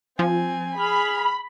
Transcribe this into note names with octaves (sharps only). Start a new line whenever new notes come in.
F3 C4 G#5
G#4 B5 F6